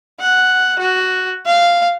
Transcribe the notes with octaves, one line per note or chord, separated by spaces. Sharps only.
F#5
F#4
F5